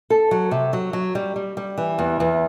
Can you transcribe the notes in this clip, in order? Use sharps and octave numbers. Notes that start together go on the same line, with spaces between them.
A4
F#3
C3
F#3
F#3
G3
G3
G3
E3
E2
E2